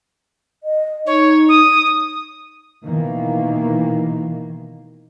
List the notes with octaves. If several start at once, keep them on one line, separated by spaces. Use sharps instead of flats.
D#5
D#4 C#5
D#6
B2 D#3 E3 A#3